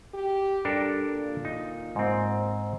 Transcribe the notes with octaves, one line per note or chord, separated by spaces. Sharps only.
G4
G3 D4 A4 A#4
A#2
D#4
G#2 C4